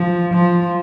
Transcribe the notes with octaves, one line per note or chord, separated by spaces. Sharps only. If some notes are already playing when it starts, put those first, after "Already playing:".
Already playing: F3
F3